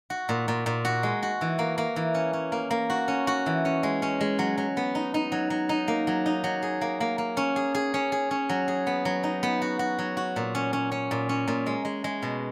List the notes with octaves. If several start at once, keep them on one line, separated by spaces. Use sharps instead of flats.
F#4
A#2
A#2
A#2
F#4
G#3
F#4
E3
A#3
A#3
E3
C#4
C#4
A#3
A#3
F#4
C#4
F#4
E3
C#4
G#3
C#4
G#3
F#3
F#3
B3
D#4
D#4
F#3
F#3
D#4
A#3
F#3
D#4
F#3
G#4
A#3
A#3
A#3
C#4
G#4
G#4
C#4
G#4
C#4
F#3
G#4
B3
F#3
D#4
B3
F#4
F#4
F#3
F#4
A#2
C#4
C#4
C#4
A#2
C#4
A#2
G#3
G#3
G#3
B2